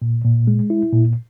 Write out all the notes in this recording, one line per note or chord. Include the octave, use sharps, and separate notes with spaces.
A#2
A#2
G#3
E4
A#2